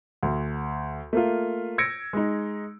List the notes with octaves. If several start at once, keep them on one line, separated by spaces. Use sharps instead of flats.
D2
A3 A#3 F4
E6 G#6 A#6 C#7 D7
G#3 D#4